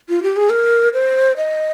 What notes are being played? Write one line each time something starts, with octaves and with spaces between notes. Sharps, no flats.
F4
G4
G#4
A#4
C5
D#5